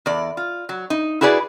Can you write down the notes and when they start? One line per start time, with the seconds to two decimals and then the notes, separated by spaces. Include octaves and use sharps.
0.06 E2 D5
0.37 F4
0.69 F#3
0.90 D#4
1.21 E4 F#4 G#4 B4 D5